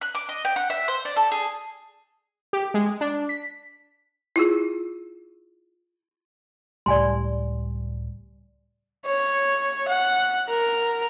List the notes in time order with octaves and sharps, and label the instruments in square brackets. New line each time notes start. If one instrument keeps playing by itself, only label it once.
[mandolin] F#6
D6
D#5
G5
F#5
E5
C5
D5
A4
G#4
[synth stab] G4
G#3
D4
B6
[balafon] E4 F4 G#4
[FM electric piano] C#2 A2 G3 [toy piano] D5 G#5 C6
[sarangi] C#5
F#5
A#4